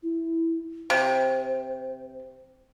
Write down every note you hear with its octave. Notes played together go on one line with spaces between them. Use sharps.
E4
C3 C5